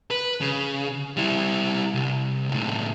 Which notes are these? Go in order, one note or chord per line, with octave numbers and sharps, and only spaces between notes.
B4
C#3
G3 E4
C2
C#2 A2